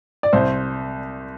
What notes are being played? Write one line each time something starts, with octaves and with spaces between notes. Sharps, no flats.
D5
C2 C5